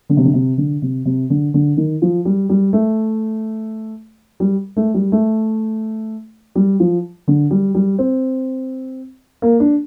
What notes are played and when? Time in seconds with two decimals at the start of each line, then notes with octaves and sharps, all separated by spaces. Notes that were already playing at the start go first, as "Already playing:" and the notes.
0.09 D3
0.17 C3
0.25 D3
0.34 C3
0.58 D3
0.82 C3
1.05 C3
1.30 D3
1.54 D3
1.77 D#3
2.02 F3
2.25 G3
2.49 G3
2.73 A3
4.40 G3
4.77 A3
4.94 G3
5.12 A3
6.55 G3
6.80 F3
7.28 D3
7.51 G3
7.75 G3
7.99 C4
9.42 A#3
9.60 D4